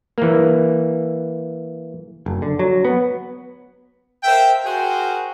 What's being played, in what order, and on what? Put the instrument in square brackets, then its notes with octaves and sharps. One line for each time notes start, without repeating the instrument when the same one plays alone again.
[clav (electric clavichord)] E3 A#3
[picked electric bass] F#1
D3
F#3
B3
[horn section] A#4 C5 E5 F5 G5
F#4 G#4 A#4 C5 F#5 G5